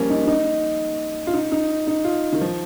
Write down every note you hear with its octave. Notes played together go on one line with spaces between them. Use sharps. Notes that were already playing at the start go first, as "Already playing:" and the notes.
Already playing: F3 G3 A#3 C#4
D#4
D#4
F4
D#4
D#4
D#4
F4
D#3
F3